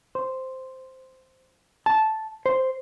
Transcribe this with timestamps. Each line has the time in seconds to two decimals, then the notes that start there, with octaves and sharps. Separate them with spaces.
0.15 C5
1.86 A5
2.46 C5